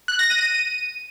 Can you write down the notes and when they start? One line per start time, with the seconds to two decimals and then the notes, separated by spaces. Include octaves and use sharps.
0.08 F#6
0.19 A#6
0.30 D#7
0.41 D#7